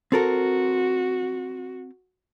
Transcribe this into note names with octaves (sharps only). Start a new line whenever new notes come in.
C4 F#4 A4 A#4